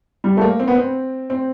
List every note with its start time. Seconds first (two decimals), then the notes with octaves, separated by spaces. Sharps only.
0.24 G3
0.37 A3
0.41 A#3
0.59 C4
0.68 B3
0.75 C4
1.30 C4